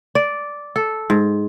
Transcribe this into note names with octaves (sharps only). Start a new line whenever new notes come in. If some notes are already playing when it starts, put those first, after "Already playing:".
D5
A4
G#2